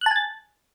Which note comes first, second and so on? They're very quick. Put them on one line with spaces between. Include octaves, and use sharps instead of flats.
F#6 A5 G#5 A6